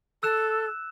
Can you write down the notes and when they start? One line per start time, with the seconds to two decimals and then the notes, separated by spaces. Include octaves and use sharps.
0.23 A4 E6 F#6 E7